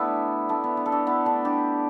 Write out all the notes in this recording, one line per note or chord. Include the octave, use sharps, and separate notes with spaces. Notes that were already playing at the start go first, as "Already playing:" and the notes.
Already playing: A3 B3 D4 E4
A3 D4
B3
B3
A4
D4 G4
B3 E4
A3 D4
D4 G4